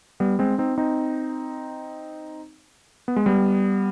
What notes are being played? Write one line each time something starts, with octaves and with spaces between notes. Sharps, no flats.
G3 B3
G#3 C4
C4 D#4
C4 D#4
B3
G#3
G3 B3